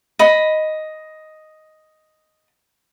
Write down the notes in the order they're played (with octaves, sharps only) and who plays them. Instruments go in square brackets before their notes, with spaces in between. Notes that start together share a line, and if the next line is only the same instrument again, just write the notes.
[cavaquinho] D#5 B5